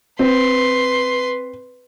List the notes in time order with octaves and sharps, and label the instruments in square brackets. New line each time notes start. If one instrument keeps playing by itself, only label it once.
[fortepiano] C4 [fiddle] B4 C6